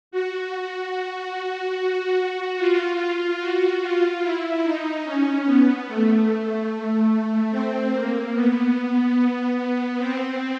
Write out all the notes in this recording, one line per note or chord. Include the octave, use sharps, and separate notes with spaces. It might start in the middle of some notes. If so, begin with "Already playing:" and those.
F#4
F4
F#4
F4
E4
D#4
C#4
B3
A3
C4
A#3
B3
C4